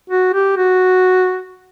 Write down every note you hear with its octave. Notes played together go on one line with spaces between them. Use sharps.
F#4
G4
F#4